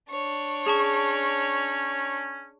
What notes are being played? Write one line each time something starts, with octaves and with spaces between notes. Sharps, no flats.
D4 C#5
C#4 G#4 A5 C#6